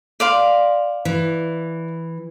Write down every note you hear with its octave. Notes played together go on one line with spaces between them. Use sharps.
D5 F5 C6
E3